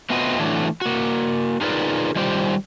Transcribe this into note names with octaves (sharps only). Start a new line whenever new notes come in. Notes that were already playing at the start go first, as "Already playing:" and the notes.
A3 B3 C4 F4 F#4 D#5
E3 F#3 A3 D4
A#3 F#4
D#4 F4 G#4 A#4 B4 D5
D#3 G3 F4 G4 C5 G5